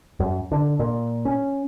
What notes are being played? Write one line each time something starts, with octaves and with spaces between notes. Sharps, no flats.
F#2
D3
A#2
C#4